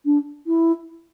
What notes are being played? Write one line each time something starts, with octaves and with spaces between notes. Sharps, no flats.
D4
E4